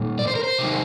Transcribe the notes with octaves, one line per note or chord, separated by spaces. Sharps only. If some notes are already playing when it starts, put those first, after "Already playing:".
Already playing: A#2 G3
D5
C5
A#4
C5
C3 D#3 G3